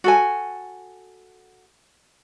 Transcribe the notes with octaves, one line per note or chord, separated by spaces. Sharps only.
F#4 A4 G#5